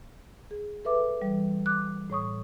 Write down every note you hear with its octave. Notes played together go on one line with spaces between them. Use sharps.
G#4
A4 B4 E5 D6
E3 G3
D6 F#6
A2 C#5 C#6 D#6